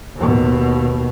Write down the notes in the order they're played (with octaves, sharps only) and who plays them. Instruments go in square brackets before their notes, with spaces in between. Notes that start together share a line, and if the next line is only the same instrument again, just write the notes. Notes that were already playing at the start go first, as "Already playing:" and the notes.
[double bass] D#2 B2